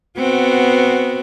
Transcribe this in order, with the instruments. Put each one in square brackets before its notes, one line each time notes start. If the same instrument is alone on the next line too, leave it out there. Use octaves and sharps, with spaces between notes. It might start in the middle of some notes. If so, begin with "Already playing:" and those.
[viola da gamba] B3 C4 F#4